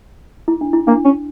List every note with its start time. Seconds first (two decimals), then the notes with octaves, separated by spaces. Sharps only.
0.48 E4
0.61 D4
0.73 E4
0.87 A#3 D4
1.05 C#4